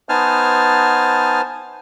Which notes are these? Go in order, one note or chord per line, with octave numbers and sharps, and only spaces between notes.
B3 D#4 C5 G#5 A5 F6